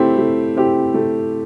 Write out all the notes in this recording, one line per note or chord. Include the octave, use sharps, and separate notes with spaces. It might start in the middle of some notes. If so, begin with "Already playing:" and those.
Already playing: A3 C4 E4 G4
A3
C4 E4 G4
A3